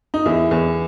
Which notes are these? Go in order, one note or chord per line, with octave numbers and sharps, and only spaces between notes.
D#4
E2 E4
E2